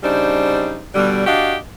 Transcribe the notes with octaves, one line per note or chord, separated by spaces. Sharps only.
C#3 G3 D4 D#4 C5
B2 D3 G3
D4 F#4 G4 D#5 F5